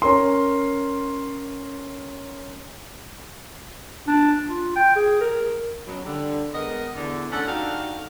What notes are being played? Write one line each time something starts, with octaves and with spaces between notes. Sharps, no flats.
C#4 A#4 C6
D4
F4
G5
G#4
A#4
F#2 B2 F#3
D3 G3
G#3 B3 A#4 D#5
E2 D3
A3 C#4 D4 A4 F#5
D4 D#4 F#4 G4 A4 F5